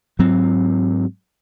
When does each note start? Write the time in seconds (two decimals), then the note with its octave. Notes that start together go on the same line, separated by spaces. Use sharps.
0.19 G#2 F#3 C4